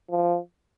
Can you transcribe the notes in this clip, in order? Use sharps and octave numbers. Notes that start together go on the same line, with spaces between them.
F3